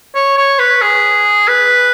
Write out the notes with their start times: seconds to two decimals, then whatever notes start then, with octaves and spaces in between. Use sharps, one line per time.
0.15 C#5
0.37 C#5
0.59 B4
0.81 G#4
1.47 B4